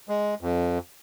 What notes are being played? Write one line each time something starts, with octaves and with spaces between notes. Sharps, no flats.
G#3
F2